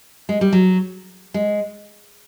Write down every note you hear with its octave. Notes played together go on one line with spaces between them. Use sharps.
G#3
G3
F#3
G#3